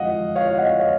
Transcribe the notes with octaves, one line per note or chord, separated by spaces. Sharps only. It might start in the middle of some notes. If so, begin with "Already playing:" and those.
Already playing: F2 G#3 D#5 F5 F#5
C#5 F5
D#5 F#5
C#5 F5